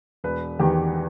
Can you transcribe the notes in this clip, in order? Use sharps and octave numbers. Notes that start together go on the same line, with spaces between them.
E1 B4
E2 D#3 G4